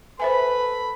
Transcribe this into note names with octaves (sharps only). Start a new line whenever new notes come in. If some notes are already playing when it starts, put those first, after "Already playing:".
A4 B4 C5 E5 G#5 B5